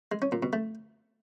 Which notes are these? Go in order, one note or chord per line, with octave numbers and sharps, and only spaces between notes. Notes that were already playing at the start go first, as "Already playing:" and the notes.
G#3
C#4
A#2
B2
A3